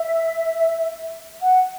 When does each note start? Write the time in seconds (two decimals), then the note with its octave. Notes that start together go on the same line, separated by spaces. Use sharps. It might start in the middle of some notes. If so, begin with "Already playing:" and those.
Already playing: E5
1.40 F#5